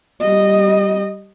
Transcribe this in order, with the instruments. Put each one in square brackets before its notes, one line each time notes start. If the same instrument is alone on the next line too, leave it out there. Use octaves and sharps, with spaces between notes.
[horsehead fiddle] G3 D#5